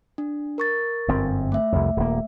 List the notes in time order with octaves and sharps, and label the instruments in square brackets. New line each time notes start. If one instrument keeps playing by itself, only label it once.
[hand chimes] D4
A#4 C#6 A6
[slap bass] G1 F#2 C4
[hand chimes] A3 E5
[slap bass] C2 F2
D#1 A#3